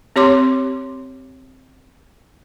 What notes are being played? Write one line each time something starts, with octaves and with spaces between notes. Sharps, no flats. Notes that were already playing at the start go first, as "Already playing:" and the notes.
C4 G4 C#5 C6 D6